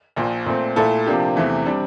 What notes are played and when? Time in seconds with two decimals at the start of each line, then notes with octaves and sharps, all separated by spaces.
0.16 A#1 A#2 F3
0.46 A#2 A3 C4
0.76 A#2 A3 E4 A4
1.06 C3 F3 A#3 D4 G4
1.36 E2 C3 E3 A3
1.66 C3 G3 D4